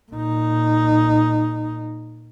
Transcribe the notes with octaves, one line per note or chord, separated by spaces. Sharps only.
A#2 D#4